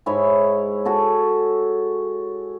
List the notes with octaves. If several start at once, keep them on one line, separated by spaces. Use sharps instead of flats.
G#2 E4 C#5 G#5
F#4 G#4 A4